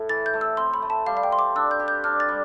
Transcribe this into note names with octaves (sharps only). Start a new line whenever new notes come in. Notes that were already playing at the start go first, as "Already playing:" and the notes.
Already playing: A2
E3 A6
G6
A3
E6
C4 C6
B5
A3
A5
G3 F5
F5
G5
C5 C6
D6
D4 E6
G6
G4
G6
D4 F6
A6
G3